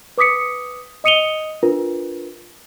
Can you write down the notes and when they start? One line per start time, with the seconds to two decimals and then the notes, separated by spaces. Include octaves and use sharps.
0.18 B4 D6 D#6 B6 C#7
1.04 D#5 D#6 C#7 D#7 F7 G7
1.63 D4 F4 A#4 B4